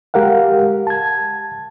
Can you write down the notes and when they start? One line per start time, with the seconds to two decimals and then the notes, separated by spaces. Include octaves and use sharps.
0.14 G#3 G4 A#4 F5 F#5
0.87 A5 G#6